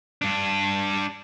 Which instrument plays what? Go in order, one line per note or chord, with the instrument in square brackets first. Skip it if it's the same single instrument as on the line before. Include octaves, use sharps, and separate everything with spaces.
[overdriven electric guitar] G2 D4